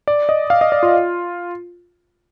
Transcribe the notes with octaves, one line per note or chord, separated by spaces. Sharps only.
D5
D#5
F5
D#5
D5
F4